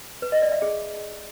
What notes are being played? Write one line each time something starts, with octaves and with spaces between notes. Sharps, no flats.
B4
D#5
D5
E5
G#4